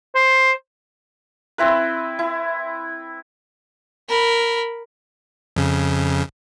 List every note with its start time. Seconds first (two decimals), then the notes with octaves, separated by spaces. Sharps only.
0.15 C5
1.58 C4 E4 B4
2.19 E4
4.09 A#4 B5
5.56 F2 C#3